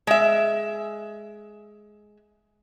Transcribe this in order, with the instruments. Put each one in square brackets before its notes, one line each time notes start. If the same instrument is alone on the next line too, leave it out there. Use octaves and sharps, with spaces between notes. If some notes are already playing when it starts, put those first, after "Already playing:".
[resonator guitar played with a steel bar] G#3 E5